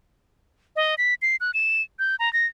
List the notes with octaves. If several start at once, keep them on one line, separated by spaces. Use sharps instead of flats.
D#5
B6
C7
F#6
E7
G6
A#5
A#6